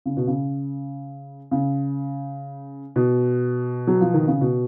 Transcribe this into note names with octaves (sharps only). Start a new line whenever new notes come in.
C#3
B2
C#3
C#3
B2
F#3
F3
D#3
C#3
B2